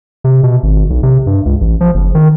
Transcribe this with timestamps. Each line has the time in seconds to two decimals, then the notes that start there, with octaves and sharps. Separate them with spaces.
0.24 C3
0.43 B2
0.63 G#1
0.90 B1
1.03 C3
1.26 G2
1.45 C#2
1.61 A1
1.81 F3
1.94 F#1
2.15 D#3